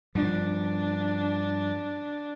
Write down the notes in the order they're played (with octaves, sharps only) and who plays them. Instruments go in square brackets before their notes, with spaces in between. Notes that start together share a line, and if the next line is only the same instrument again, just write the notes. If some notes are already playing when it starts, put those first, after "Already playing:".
[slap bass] G2 F3 [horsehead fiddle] D4